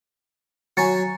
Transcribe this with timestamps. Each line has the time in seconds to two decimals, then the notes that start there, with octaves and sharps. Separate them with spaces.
0.77 F#3 C#5 G#5 A#5 A6 C#7